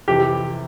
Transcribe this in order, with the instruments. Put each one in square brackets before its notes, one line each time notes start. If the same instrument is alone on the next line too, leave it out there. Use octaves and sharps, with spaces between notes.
[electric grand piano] F2 C3 E3 [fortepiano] G4